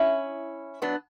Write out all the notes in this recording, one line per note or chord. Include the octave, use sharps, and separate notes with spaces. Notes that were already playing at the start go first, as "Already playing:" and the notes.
Already playing: C#4 E4
F#3 B3 D4